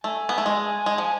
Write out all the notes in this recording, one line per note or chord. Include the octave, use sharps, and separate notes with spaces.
A3 G#5
B3
A3
G#3
G#3
F3